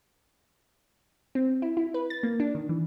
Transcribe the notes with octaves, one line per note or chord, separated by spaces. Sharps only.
C4
E4
E4
B4
A6
A#3
D4
D#3
E3